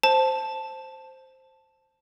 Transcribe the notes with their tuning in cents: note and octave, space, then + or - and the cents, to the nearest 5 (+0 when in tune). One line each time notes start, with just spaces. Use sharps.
C5 +0 A5 +0